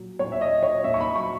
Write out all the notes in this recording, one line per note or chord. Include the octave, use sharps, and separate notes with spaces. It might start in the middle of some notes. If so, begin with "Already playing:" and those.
Already playing: A#2 F#3
A#2 C#5
E5
D#5
F#3
C#5
A#2 E5
C#6
B5
F#3 C#6